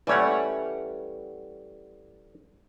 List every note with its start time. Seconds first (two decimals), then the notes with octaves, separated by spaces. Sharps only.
0.07 E3 G3 A3 C#4 C#5 F#5